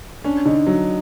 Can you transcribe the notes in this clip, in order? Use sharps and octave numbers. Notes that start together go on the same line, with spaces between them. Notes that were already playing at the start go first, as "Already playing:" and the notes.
C#4 D4
D3 D#4
F#3